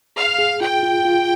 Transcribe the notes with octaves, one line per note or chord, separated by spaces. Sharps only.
G#4 F5
G#4
F4 G5
F4
F4